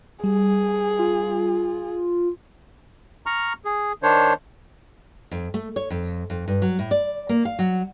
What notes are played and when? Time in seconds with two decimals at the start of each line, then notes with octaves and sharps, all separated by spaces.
0.24 G3 G#4
0.99 F4
3.26 A#5 C#6 F6
3.65 G#4
4.03 D#3 D4 C5 C#5
5.31 F2
5.54 A3
5.76 C#5
5.90 F2
6.30 F2
6.48 G2
6.62 F#3
6.79 A2
6.91 D5
7.29 A#3
7.45 F5
7.59 F#3